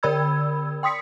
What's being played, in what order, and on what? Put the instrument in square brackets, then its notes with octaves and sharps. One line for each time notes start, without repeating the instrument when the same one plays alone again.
[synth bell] D3 A#4 D5 B5 E6 G#6
G5 C6 D#6 B6 C#7